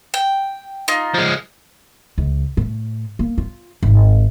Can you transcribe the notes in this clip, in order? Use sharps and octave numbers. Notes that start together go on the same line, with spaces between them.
G5
D#4 F4
F3 G#3
C#2
A2
A#3
F4
G#1